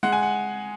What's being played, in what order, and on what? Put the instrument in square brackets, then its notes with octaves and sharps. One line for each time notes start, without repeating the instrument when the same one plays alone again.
[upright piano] G#3 F#5
G#5
F#5